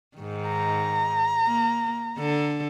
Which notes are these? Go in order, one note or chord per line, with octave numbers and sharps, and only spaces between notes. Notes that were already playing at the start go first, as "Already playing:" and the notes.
G#2 D#3
A#5
A#3
D3 A4